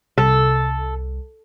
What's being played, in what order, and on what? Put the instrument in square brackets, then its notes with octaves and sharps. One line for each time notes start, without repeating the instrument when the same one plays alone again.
[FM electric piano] C2 [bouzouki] A4